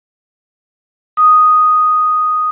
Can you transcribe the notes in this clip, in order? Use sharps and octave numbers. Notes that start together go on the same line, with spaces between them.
D#6